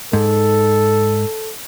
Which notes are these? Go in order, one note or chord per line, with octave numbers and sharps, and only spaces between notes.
G#2 A4